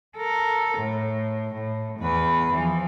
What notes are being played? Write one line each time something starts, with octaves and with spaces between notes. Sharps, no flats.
A4 A#4
A2
A2
E2 B4
E3 F3